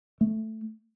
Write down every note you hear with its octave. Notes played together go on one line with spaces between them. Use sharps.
A3